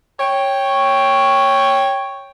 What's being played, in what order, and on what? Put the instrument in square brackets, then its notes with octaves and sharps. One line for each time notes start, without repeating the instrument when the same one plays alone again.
[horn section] C#5 G5